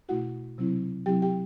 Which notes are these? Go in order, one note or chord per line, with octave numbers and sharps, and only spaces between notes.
B2 A3 E4 F#4 F#5
C3 F#3 C4 E4
C3 F#3 C4 E4 G4 G5
G4 G5